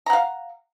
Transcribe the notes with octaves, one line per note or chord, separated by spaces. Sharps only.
F5 F#5 A#5